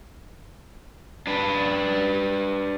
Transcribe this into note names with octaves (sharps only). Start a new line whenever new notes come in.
D4 B4